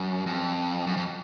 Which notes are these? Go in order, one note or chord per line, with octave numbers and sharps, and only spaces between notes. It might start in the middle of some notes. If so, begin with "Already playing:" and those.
Already playing: F#2
F2
F#2
F2